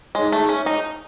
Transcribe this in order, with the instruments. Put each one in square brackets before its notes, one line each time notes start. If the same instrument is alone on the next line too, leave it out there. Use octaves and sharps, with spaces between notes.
[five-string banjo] G#3 [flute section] D#4 G#4 C#5
[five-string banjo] A3
C#4
D#4